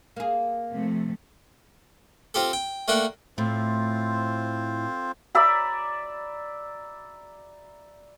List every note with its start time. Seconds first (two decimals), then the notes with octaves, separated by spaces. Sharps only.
0.16 A#3 G#4
0.71 C3 F3 A3
2.34 C4 F4 G4 A4
2.53 G5
2.88 A3 A#3 D4 F#5 G5
3.38 A2 C4 F4 C5
5.35 D5 E5 A#5 B5